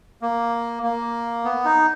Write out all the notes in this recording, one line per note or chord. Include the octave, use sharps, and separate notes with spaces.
A#3
A#3
B3
D#4